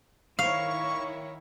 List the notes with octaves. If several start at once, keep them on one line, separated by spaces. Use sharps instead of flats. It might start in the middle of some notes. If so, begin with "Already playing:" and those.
D#3 E4 C#5 F5 C#6